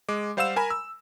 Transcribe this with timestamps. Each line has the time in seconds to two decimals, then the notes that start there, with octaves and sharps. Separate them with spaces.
0.09 G#3 D6
0.37 G3 C5 F5 F#5 E6 E7
0.56 A#4 G#5 A#5 B5
0.70 E6